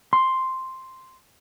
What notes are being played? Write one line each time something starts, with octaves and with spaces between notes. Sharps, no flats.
C6